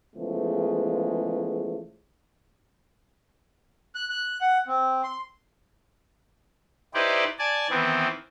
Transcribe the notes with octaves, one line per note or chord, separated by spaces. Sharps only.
C#3 E3 F3 G#3 A3 B3
F#6
F#6
F#5
C4
C6
D#4 E4 G4 B4 C5 D5
D5 G#5 A5
D#3 E3 B3 C4